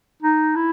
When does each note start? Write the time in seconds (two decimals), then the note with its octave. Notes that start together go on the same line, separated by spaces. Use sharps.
0.22 D#4
0.56 E4